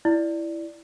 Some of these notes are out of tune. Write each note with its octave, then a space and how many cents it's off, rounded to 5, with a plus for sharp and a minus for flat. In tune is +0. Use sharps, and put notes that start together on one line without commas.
E4 +5 D5 +0